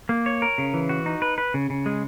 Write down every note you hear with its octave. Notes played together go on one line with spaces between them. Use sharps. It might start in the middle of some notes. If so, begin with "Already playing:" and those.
A#3
C#5
A#4
C#3
E3
F#4
D#4
B4
B4
C#3
C#3
G#3